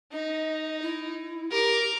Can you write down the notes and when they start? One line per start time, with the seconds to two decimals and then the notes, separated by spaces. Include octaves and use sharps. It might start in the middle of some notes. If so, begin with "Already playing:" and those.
0.12 D#4 D#5
0.82 E4
1.51 G4 A#4 D6